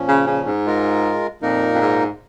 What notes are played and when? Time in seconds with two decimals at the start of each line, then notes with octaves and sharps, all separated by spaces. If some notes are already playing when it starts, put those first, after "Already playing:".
Already playing: A#2 F3 C#4
0.08 C#3
0.26 C#3
0.46 G#2
0.66 G#3 F4 A#4
1.42 F2 A#2 A#3 D#4 A#4
1.74 F2
1.81 G#2